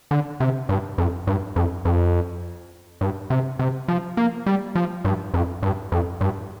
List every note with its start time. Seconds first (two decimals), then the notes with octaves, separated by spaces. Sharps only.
0.11 D3
0.40 C3
0.69 G2
0.98 F2
1.27 G2
1.56 F2
1.85 F2
3.01 G2
3.30 C3
3.59 C3
3.88 F3
4.17 A#3
4.46 G3
4.75 F3
5.05 G2
5.34 F2
5.63 G2
5.92 F2
6.21 G2